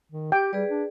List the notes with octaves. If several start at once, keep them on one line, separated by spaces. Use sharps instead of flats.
D#3
G4 G5
G3 G#4 B4 D5
D4